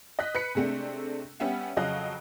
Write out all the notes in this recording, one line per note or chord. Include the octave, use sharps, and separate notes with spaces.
D#5 F#6 B6
B4 F#6 B6 C#7
C3 G#3 A3 C4 D4
G3 B3 C#4 G4 E5 F#5
F2 C#3 F#3 D#5 F5 F#6